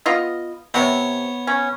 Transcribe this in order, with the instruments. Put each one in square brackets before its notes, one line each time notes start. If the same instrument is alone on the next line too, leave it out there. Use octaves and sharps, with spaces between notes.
[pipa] B3 F4 D#5
[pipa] C3 [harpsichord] B3 C#5
[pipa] C#4